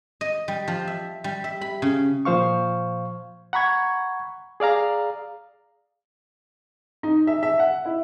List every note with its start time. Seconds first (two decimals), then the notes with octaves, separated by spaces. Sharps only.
0.21 D#5
0.48 G3
0.68 F3
0.87 E5
1.24 G3
1.44 E5
1.61 B5
1.82 C#3
2.25 A#2 F3 C5 F5 C#6
3.53 F#5 A#5 B5 C#6 G#6
4.60 G#4 D5 F5 A#5
7.03 D#4
7.27 E5
7.43 E5
7.59 F#5
7.85 E4